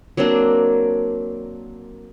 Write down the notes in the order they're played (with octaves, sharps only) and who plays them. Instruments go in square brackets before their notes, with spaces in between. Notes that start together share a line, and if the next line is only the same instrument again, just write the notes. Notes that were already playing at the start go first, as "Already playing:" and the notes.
[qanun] F#3 A#3 C4 D4